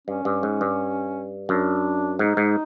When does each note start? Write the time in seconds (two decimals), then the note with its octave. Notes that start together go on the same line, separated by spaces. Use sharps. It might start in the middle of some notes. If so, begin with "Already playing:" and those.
0.07 G2 C#4
0.25 G2
0.43 G#2
0.61 G2
1.49 F#2 D4
2.19 G#2 D#4
2.37 G#2